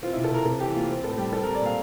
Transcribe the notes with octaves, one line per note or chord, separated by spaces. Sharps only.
C4 F4
C3 E4
A4
C3 A#4
C3 A4
E3 G4
A#3 F4
C4
A2 A4
G3 G4
C4 A4
G3 A#4
D5
A#2 F5